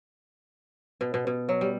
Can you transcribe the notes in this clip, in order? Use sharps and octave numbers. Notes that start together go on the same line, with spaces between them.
B2
B2
B2
F#3
G3